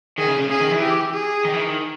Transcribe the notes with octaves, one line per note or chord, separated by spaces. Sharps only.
D#3 G#4
C#3
C#3
C#3 G#4
D#3
E3
G4
G#4
D#3
E3
D#3